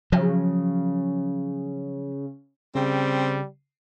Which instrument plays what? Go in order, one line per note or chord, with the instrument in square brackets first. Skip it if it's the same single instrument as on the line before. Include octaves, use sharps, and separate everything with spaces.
[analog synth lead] C#3 [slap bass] F3 F#3
[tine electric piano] C#3 [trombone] G3 [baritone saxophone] C4